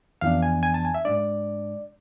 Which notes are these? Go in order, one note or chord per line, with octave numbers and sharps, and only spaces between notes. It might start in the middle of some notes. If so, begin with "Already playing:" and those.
F2 E3 B3 D4 F5
G#5
G#5
A5
G#5
E5
G#2 G#3 D4 D5